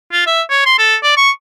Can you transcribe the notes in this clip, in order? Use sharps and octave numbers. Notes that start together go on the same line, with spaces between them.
F4
E5
C#5
C6
A4
D5
C#6